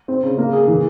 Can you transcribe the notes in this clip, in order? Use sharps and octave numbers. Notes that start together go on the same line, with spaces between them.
C4
C#3
A#3
G#4
E3